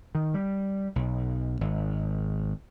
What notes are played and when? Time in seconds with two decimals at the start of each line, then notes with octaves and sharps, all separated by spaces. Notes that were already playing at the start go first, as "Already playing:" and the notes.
0.15 D#3
0.34 G3
0.96 B1
1.61 G#1